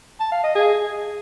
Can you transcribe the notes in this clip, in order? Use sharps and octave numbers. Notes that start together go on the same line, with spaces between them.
A5
F5
D#5
G#4